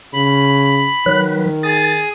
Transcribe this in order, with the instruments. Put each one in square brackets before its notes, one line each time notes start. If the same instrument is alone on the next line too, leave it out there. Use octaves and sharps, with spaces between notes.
[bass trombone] C#3 [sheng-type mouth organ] B5
[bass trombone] D#3 [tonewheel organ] F#3 B4
[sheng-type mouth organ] G#4 D#6 [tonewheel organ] A6